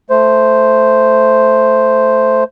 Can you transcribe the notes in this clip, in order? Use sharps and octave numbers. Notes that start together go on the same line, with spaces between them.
A3 C5